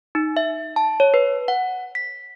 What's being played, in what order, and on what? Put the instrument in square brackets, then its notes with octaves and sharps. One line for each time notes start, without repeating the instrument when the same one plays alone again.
[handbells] D#4
E5
A5
C#5
B4
F#5
B6